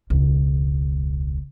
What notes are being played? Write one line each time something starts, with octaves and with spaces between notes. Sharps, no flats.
E1 C#2